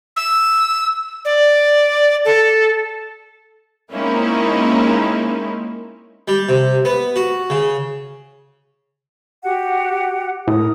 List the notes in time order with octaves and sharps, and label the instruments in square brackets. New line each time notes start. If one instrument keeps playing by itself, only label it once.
[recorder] E6
D5
A4
[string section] G#3 A#3 C4 C#4 D#4 E4
[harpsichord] G3
C3
B3
F#4
C#3
[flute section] F#4 G4 F#5
[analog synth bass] A2 [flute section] A#4 D#6